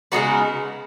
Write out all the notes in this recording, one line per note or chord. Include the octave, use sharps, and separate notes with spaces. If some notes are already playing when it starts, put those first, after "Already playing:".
C#3 G#3 B3 D#4 F#4